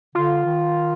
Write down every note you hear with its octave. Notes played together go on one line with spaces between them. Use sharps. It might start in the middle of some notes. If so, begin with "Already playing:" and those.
D3 F4
D#3